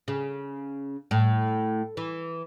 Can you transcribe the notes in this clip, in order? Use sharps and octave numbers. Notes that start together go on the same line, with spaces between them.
C#3
A2
E3